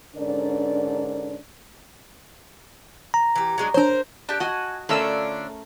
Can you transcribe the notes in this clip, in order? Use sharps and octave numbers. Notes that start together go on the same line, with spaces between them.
G#2 D3 C#4 D4 A#4 D5
A#5
E3 G4
F#3 G#3 D4
D4 A#4 C5 C#5
D4 G4 A5
F#4 D#5 F#5 G#5
D3 A3 C#4 D4 F4 A#4 C#5 E6